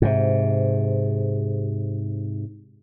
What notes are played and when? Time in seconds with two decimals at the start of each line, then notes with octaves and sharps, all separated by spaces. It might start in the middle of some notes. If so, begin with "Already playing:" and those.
0.02 G#2 C3